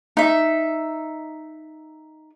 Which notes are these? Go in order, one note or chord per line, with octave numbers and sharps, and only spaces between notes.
D#4 E5